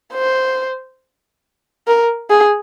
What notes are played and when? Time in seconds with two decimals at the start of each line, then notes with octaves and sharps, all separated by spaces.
0.13 C5
1.87 A#4
2.30 G#4